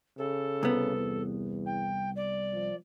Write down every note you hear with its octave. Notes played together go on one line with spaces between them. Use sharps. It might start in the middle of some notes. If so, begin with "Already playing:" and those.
C#3 A4
C2 B3
E2
G5
D5
F3